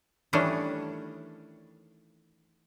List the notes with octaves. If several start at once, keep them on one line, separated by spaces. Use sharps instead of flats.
D#3 E3 G3 A3 C#4 D4